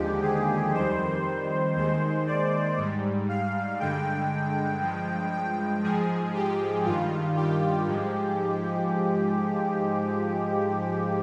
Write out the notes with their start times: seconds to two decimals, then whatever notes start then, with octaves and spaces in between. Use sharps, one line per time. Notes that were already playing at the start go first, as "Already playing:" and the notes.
Already playing: D#2 D3 F3 G#3 G4
0.22 G#4
0.74 F2 D#3 G3 C5
1.76 D#2 D#3 G#3 C5
2.27 D5
2.78 G#2 G3
3.29 F5
3.80 G2 D3 G#3 G5
4.81 G2 F3 G#3
5.32 G5
5.83 G#2 F3 G#3 G#4
6.34 G4
6.85 G2 D#3 G3 F4
7.36 G4
7.87 G#2 F3 G#3